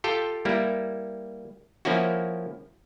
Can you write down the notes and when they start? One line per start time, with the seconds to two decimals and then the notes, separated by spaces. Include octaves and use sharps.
0.04 F4 G4 A4 G5
0.45 G3 A#3 E4
1.85 F3 A#3 C#4 E4 F#4